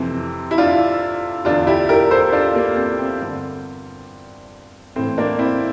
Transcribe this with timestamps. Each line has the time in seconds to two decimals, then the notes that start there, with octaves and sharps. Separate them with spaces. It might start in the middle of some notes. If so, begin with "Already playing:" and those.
Already playing: F2 C3 E3 C4
0.51 E4
0.58 D4 F4
1.45 E2 D3 D4 F4
1.67 E4 G4
1.89 G4 A#4
2.11 A4 C5
2.33 D4 F4
2.55 A#3
2.76 C4
2.99 C4
3.21 G2 D3
4.96 A2 E3 C4
5.18 A#3 D4
5.39 C4 E4